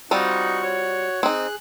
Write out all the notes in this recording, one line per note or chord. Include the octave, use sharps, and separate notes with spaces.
G3 C4 D#4 F4 F#4 F#5 C#6
C#5
C4 D#4 G#4 F#6